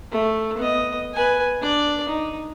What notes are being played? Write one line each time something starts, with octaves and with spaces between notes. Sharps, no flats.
A3
B3 D#5
B4 G#5
D4 D5
D#4